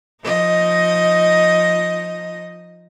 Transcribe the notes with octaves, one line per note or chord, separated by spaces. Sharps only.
F3 D#4 D#5